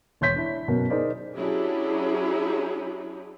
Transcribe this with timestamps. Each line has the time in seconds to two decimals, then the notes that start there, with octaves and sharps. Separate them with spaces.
0.21 E1 C#5 C6 G6 B6
0.36 D4 E4
0.68 F#2 B2 A#4
0.90 D#4 G#4 A#4 C5 D5
1.36 F#3 C#4 D4 E4 G4 G#4